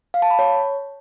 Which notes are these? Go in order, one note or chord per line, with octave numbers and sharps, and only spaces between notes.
F5
A5
B5
C#5